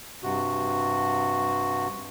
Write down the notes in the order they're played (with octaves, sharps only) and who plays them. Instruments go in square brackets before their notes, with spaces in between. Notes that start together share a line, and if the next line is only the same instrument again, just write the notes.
[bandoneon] G2 C3 F#4